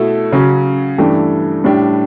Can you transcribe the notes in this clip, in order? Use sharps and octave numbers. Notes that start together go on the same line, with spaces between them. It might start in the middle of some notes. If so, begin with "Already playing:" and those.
Already playing: B2 A3 E4 A4
C#3 F#3 C#4
G2 E3 A3 D4 G4
A2 G3 D4 G4